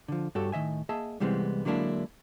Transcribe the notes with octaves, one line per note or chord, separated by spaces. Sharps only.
D3 F3
G2 F#4 G4 A4 C#5
A2 D#3 D#5 E5 G#5
A#3 G#4 D#5 E5 A5
C2 E3 G3 G#3 B3 C4
D3 F#3 G#3 A#3 D4 E4